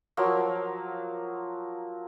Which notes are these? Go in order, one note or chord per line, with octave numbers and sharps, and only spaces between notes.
F3 F#3 A#3